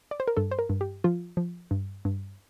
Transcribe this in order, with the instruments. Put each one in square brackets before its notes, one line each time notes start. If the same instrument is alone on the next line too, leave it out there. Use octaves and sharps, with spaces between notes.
[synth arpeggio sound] D5
C5
A#4
G2 A4
C5
A#4
G2
G4
F3 F4
F3
G2
G2